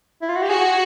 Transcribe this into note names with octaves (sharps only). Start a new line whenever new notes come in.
E4
F4
F#4
G4
F#4 G#4